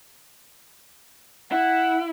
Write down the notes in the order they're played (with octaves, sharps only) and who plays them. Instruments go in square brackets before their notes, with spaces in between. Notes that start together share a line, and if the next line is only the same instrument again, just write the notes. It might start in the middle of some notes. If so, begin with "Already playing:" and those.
[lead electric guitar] E4 [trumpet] F#5